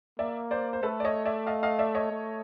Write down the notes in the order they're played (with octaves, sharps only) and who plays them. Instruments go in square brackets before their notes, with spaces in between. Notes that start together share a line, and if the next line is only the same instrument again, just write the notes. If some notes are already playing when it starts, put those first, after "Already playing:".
[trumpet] A#3 [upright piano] D5 E5
[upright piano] C5 D5
C5
[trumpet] A3 [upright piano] A4 B4
[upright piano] D5
C#5 D#5
D5 E5
D#5 F5
D#5 F5
D5 E5
C#5 D#5
[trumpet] A3